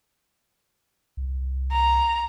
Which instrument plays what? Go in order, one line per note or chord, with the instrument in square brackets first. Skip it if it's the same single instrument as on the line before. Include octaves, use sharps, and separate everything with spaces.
[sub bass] C2
[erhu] A#5